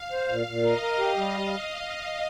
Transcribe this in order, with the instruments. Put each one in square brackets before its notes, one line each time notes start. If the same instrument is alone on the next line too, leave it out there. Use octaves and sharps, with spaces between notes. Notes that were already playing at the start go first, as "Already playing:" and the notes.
Already playing: [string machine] F5
[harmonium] C5
A#2
A#2
[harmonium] A#4 [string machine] D#5
[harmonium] A#4
G4
G3